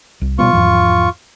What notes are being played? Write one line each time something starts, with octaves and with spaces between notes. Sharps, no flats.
C2
B2 G3 B3 F4 C#6
E2 G#2 F3